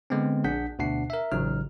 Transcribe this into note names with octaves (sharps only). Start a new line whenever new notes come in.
D3 G#3 B3 C4
A#1 D4 G#4 F#5 G6 B6
D2 B2 D4 F#5 C7
A#4 E5
A1 C#3 F#3 D#4 F6